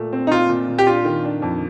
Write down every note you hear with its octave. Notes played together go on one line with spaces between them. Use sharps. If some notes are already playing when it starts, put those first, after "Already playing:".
Already playing: A#2 A3
C4
D#4
A#2 F4
A#2
A#2
G4
D4 F4
D#3
D4
F2